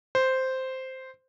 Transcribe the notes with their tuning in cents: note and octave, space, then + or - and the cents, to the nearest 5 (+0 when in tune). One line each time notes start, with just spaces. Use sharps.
C5 -5